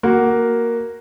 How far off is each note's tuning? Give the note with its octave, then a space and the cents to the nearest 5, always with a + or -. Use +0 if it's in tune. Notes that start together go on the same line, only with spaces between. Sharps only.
A#3 +0 F#4 +0 A#4 +0